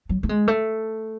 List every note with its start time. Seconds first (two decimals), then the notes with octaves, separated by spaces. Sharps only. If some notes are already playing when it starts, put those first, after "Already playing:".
0.09 F#3
0.23 A3
0.29 G#3
0.48 A3